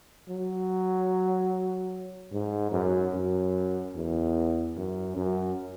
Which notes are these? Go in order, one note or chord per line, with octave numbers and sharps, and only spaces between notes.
F#3
G#2
F#2
F#2
E2
F#2
F#2